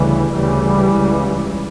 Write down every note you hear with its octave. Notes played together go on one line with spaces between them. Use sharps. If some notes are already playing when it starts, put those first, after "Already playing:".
Already playing: D2 C#3 E3 G3
D2 C#3 E3 G3
C#2 C#3